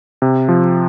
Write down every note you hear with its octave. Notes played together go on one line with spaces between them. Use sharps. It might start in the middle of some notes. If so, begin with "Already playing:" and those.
C3
F3